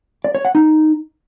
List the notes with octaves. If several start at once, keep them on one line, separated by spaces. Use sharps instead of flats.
D5
C#5
F#5
D#4